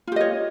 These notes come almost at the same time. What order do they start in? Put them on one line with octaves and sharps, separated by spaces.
F4 G4 D#5 C#5